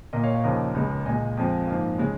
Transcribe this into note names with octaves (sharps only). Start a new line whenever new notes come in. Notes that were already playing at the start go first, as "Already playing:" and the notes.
A#2 A#3 A#4 D#5
C#5 F5
C#5 F5
D#2 C#3 F3 A#3 A#4 D#5
C#2 C#3 G#3
A#2 G#3 D#5 G#5
F2 F3 G#3
G#2 F3 A#3
C#3 G#3